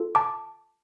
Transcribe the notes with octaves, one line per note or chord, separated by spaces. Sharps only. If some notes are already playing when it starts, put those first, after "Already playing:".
Already playing: F4 A4
A5 D6